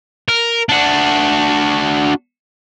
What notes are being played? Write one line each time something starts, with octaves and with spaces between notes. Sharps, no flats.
A#4
D4 F#4